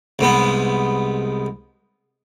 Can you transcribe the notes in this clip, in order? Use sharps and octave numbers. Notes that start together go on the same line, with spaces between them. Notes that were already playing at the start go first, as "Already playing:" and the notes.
C2 G#2 B3